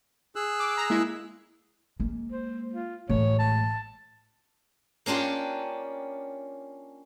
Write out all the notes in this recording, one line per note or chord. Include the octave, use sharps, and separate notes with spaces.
G#4 E6 F#6
D6
A#5
G#3 A#3 E4
G#3 A#3
C5
F4
A1 G#3 C#5
A5
A#3 C#4 D4 F4 G4